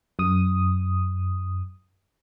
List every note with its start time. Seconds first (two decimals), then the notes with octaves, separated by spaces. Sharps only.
0.19 F#2 D#6